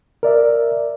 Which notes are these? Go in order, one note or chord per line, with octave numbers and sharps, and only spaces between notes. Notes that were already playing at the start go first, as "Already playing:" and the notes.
A#4 D5 E5